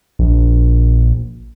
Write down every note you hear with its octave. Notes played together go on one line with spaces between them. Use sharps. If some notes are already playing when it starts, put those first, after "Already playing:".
A#1